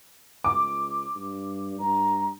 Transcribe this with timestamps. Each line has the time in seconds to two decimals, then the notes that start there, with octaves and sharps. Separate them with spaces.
0.44 C#2 D6
1.15 G2
1.80 G2 A#5